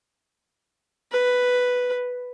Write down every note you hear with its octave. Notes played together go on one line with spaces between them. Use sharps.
B4